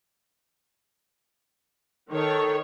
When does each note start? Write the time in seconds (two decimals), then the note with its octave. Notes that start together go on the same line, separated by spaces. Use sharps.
2.11 D#3 A4 C#5